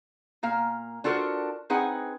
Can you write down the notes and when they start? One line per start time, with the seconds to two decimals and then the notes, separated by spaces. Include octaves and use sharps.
0.43 A#2 A#3 F5
1.04 D4 F4 F#4 A4 A#4 C5
1.70 C4 D#4 G#4 B4 F#5